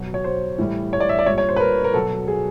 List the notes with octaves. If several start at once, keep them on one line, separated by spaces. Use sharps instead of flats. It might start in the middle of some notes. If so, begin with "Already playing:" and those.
Already playing: B2 F#3
C#5
C5
A2 E3 G3
C#5
D5
E5
D5
A#2 G3 C#5
C#5
C5
B4
A#4
A#4
B2 F#3 A4
G#4